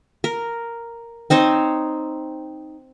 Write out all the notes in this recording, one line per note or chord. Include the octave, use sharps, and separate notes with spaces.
A#4
C4 D#4 C5 C#5